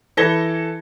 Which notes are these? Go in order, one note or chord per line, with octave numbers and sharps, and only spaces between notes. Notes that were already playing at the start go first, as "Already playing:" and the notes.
E3 A4 A5 G#6 A#6 G7